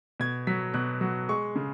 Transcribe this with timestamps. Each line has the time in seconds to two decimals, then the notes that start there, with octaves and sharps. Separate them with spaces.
0.20 B2 G#6
0.47 F#3 B6
0.74 B2 F#6
1.01 F#3
1.29 G#3 C#6
1.56 C#3